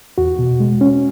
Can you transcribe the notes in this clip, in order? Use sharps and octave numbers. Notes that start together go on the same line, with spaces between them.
E2 F#4
B2
G#3
C#4